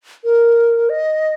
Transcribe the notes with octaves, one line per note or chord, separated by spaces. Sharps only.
A#4
D#5